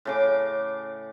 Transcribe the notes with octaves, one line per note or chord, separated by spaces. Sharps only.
A2 C#3 D6